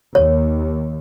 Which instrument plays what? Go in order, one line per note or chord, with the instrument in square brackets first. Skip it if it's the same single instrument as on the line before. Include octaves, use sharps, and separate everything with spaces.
[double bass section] D#2 [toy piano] C#5